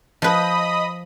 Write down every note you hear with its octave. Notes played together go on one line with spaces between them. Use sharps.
F3 B4 D#5 B5 D#6